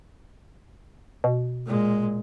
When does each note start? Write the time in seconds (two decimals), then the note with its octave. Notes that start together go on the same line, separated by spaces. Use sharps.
1.24 B2
1.66 A#2 G#3